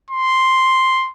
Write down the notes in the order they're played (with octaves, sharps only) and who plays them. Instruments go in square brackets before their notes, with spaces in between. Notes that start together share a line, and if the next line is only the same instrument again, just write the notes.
[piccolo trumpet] C6